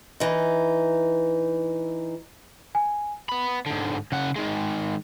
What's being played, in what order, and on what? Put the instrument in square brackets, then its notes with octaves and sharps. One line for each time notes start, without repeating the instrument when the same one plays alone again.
[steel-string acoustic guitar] E3 D#4
[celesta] G#5
[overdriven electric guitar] B3 B5
G#2 D3
C#3 F#5
D#3 G#3